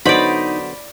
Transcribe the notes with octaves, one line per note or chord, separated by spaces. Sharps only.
D3 F#3 B3 D#4 F#4 C5 D5 B5